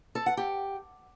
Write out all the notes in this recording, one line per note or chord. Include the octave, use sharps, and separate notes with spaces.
A4
F#5
G4